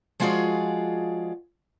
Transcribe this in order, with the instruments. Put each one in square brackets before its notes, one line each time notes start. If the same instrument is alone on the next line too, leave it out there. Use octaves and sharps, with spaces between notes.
[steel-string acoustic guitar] F3 G#3 F4 F#4 G#4 D5